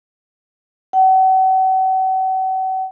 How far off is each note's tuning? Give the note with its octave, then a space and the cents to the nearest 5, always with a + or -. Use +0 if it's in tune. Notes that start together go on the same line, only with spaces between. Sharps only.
F#5 +40